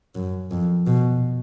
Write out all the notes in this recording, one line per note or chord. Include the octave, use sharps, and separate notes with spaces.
F#2
F2
B2